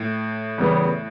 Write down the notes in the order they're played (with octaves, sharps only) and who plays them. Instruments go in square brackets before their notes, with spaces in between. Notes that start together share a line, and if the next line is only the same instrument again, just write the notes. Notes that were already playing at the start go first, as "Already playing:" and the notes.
Already playing: [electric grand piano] A2
[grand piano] E2 C#3 E3 G3 B3